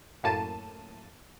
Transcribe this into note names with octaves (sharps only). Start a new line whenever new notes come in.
F#2 A2 A#3 A5 D#7